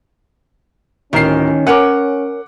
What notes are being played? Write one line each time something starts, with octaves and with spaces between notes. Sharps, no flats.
D1 D#3 C#4 A#4 C7
A#4 C#5 F#5 G#5 D6